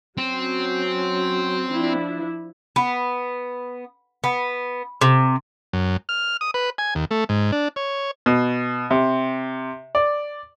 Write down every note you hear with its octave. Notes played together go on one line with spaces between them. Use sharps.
F#3 C4 C#4
F3 D4 E4
B3
B3
C3
F#2
F6
D#6
B4
G#5
D#2
A3
G#2
D4
C#5
B2
C3
D5